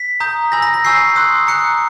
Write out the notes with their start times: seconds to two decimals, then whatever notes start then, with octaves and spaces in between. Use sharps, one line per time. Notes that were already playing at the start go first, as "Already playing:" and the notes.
Already playing: B6
0.20 A#5 D#6 G6
0.52 G#5 B5 E6 A#6
0.62 A#6
0.74 A#6
0.84 G#5 C#6 E6 G6 C7
1.16 C6 D#6 F#6
1.47 A#5 D#6 F#6 C#7